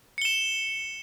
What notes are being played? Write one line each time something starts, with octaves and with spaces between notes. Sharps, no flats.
C#7 E7 G7